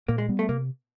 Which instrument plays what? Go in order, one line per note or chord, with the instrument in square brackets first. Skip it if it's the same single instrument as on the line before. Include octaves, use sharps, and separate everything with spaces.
[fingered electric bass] A#2 [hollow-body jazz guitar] A#3
[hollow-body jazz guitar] G#3
[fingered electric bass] G3 B3
[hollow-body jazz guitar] A3
[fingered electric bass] C3 [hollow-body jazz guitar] A#3